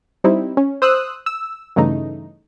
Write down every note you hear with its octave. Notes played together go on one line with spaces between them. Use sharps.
G3 C4 D#4 E4
C#4
C5 D#6 E6 F#6
E6
G2 C#3 E3 A3 D#4